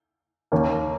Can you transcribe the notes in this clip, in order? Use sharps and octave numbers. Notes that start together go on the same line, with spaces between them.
D#2 D#3 A#3 C#4